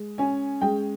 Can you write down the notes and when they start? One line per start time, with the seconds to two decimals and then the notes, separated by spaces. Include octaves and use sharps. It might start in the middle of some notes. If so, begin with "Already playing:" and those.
Already playing: G#3
0.18 C#4 G#5
0.61 G#3 G5